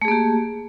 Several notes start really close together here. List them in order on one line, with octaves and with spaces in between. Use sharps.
A3 G#4 A#3 G4